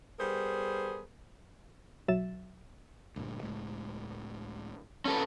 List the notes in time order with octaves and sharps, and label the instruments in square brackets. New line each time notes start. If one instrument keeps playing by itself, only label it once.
[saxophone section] G3 B3 G#4 A#4 C5
[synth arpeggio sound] B1 F#3 E5 A6 E7
[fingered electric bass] D2 G2 A#2
C#2 A2 G#3
[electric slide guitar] C#4 A4 B4